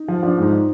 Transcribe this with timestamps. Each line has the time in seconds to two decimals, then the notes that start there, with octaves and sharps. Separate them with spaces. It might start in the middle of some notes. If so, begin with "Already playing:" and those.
Already playing: D#4
0.08 F3
0.23 F3 D4
0.38 G#2 D#4